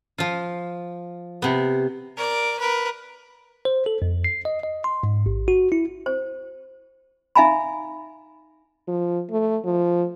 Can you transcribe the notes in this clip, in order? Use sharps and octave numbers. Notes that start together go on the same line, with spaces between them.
F3 F4
C3 B3
A#4 D5
A#4 B4
C5
A4
F2
C7
D#5
D#5
C6
G#2
A1
F#4
E4
C5
D#4 E5 F5 G#5 A#5 B5
F3
A3
F3